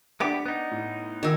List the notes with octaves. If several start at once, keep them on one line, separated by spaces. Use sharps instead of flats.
A3 B3 D4 G4 D6
B3 D#4
A2
D#3 G#5 E6 E7